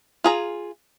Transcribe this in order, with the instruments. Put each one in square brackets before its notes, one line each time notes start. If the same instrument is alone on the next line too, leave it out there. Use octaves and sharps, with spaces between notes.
[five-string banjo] F4 G#4 A#5